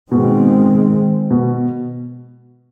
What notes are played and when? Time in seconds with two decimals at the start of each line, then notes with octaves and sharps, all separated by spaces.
0.11 G#2 B2 D#3 G#3 C4
1.30 B2